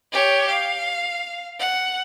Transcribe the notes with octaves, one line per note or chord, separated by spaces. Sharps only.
G4 C#5
F5
F#5